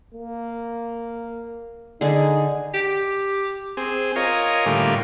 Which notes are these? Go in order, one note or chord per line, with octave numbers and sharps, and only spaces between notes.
A#3
D3 D#4 G#4
G4
C4 G#4
F4 A#4 C#5 D#5 G#5
A2 D3 G3 A#3 F4